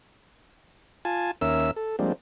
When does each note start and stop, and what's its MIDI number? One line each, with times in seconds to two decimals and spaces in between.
1.05 1.31 65
1.05 1.31 80
1.05 1.31 81
1.41 1.71 39
1.41 1.71 61
1.41 1.71 70
1.41 1.71 76
1.41 1.71 88
1.76 1.96 69
1.99 2.13 53
1.99 2.13 55
1.99 2.13 56
1.99 2.13 58
1.99 2.13 60
1.99 2.13 62